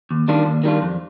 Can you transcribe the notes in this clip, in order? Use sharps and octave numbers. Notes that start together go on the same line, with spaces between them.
D#2
D#3 G3 D4 F4
D#2
D#3 G3 D4 F4
F2